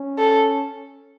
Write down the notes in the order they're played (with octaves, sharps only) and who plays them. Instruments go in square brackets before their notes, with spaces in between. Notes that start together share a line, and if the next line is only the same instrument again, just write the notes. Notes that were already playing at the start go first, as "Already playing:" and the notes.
Already playing: [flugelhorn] C#4
[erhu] A4